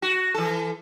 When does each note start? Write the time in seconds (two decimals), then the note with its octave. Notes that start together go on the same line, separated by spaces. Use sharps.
0.02 F#4
0.34 E3 A4